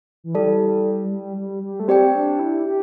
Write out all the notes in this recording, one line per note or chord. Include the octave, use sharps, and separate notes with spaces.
E3
G3 E4 A4 D5 A5
G3
G3
G3
A3
C4 G4 D5 G5
D4
E4
G4